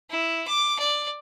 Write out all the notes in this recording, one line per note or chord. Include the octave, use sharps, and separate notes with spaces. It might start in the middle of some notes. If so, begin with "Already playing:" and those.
E4
D6
D5